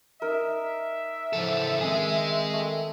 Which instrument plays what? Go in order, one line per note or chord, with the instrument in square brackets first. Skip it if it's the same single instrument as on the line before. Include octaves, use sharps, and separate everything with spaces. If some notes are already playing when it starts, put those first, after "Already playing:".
[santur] D#4 A#4 [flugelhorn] E5
[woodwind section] A2 E3 F3 [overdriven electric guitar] C#3 A4
[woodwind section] D#3 C4 [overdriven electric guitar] G#4 D#5 [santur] G5 G#5
[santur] A3